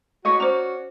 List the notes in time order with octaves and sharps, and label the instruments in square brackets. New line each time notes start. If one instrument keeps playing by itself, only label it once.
[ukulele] E4 C#5 D#5 [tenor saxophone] F#4
[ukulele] C#4 D5 [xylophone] C5 A#5